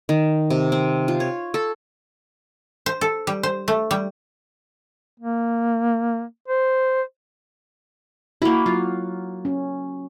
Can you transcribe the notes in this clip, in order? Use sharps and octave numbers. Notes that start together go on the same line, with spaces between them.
D#3
C3
C4
F4
C#5
A4
C5
A4
G3
C5
A3
G3
A#3
C5
A#3 E4 F#4
F#3 F4
C#4